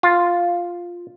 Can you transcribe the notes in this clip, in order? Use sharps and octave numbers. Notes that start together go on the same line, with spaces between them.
F4